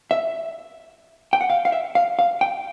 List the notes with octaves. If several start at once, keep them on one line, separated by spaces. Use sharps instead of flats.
E5
G5
F#5
F5
F5
E5
F5
F5
G5